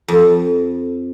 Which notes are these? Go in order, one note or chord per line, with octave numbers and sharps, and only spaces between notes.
F2